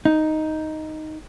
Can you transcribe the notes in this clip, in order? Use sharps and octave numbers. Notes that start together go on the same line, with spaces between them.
D#4